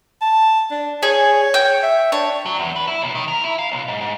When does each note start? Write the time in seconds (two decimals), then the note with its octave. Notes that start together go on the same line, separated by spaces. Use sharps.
0.22 A5
0.71 D4
1.03 G#4 C#5
1.54 G5
1.83 E5
2.12 D4 C#5
2.46 F#3
2.59 E2
2.76 B4
2.87 E4
3.02 B1
3.15 D#3
3.28 A#4
3.44 E4
3.58 F5
3.71 B1
3.88 G#2
4.01 G#2